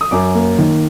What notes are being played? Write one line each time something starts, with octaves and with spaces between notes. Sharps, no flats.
D#6
F#2 D6
A#3
D#3